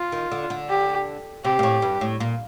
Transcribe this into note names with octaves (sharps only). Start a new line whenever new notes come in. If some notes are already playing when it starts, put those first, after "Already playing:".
Already playing: F4
D#3
D3
D3
G4
C3 G4
A#2
A2
G2
A2
A#2